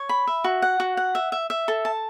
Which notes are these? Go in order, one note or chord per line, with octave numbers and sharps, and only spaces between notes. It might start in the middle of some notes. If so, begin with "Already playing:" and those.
Already playing: C#5
B5
E5
F#4
F#5
F#4
F#5
E5
E5
E5
A4
A5